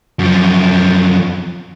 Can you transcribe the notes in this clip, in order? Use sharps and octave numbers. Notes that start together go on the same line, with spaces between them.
F#2 F3